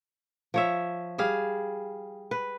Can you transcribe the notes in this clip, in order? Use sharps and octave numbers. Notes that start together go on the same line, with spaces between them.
F3 C#5 E5
G3 G#4 F5
B4